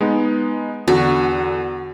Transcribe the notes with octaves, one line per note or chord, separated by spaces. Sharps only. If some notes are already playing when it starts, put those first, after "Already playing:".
G#3 B3 D#4
E2 D3 F#4